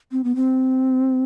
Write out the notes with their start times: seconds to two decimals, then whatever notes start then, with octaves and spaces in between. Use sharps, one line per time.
0.12 C4
0.24 B3
0.36 C4